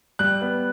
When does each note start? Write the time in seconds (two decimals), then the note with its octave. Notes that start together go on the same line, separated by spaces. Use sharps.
0.19 G3 F#6
0.42 B3